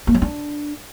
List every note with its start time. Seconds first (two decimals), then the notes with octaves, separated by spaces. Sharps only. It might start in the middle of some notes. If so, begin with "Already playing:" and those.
0.07 A#3
0.14 F#3
0.22 D4